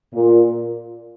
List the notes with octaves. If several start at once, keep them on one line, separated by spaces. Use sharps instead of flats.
A#2